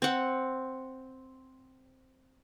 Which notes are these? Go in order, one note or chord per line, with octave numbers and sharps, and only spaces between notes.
C4 F#5